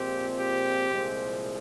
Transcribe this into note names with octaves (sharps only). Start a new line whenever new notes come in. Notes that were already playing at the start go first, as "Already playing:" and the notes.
Already playing: A#2 F3 G#3 C4 G4
G4
C2 A#2 F3 G#3 C4